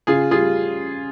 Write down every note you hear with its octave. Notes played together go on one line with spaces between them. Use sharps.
C#3 F4 G#4
G3 F4 G#4